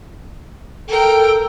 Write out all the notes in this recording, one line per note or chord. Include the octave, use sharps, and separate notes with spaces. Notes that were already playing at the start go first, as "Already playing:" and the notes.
A4 A#4 G5